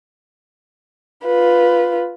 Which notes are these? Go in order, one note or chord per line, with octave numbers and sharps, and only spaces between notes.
F4 B4